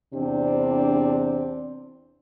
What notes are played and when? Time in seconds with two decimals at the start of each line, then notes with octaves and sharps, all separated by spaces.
0.14 E2 C3 C4 D4